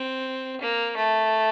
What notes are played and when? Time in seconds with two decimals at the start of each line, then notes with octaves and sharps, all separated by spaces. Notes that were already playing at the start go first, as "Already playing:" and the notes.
Already playing: C4
0.61 A#3
0.97 A3